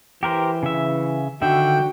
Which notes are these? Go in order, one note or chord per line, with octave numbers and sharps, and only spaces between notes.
E3 G4 A#4 C5
C#3 E5
D3 D#3 F#4 E5 G5